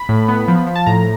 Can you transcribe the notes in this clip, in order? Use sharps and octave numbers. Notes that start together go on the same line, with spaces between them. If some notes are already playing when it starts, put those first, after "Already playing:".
Already playing: B5
A2
B3
F3
F3
A5
A2 A#5